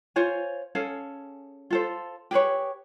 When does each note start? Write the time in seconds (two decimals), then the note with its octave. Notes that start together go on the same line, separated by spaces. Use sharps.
0.16 F4 C5 C#5 G#5
0.75 C#4 G#4 A4 F5
1.71 F4 A4 C5
2.31 G4 G#4 B4 C#5